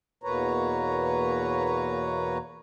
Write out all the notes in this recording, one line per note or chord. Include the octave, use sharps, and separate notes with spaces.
E2 B2 A#3 B4 C#5 A#5